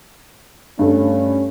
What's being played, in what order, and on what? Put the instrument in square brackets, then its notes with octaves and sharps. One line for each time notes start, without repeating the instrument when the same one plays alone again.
[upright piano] G2 A3 [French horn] C#4